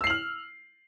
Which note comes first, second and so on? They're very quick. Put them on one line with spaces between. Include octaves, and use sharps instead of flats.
E6 C7 F#7 F6